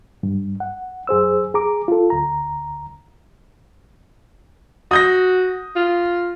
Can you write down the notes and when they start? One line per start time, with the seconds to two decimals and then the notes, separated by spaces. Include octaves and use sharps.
0.23 G2
0.60 F#5
1.07 F#2 G#4 C5 E6
1.54 G#4 A#5 D6
1.88 F4 A4
2.10 D2 A#5
4.91 F#4 D#6 G6 A#6
5.76 F4